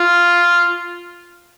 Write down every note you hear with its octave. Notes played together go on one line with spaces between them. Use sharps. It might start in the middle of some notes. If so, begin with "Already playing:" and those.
Already playing: F4